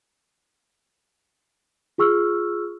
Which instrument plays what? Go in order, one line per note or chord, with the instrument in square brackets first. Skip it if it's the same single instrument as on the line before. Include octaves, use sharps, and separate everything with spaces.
[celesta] F4 G#4 C#6 E6 F6